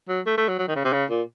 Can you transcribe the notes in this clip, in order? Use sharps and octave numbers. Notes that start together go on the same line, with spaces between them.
F#3
A3
A3
F#3
F#3
D#3
C#3
C3
C#3
A#2